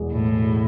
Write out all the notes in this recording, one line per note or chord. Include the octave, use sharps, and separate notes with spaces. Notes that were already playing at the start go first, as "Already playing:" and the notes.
Already playing: E1 E2 B2
A2